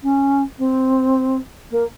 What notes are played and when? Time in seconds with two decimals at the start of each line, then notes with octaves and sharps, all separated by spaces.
0.02 C#4
0.58 C4
1.70 A#3